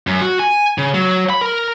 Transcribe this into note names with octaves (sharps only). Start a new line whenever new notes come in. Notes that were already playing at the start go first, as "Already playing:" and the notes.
F#2
F#4
G#5
C#3
F#3
B5
A#4